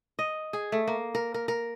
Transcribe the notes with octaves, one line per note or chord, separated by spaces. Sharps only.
D#5
G#4
A3
A#3
A#4
A#4
A#4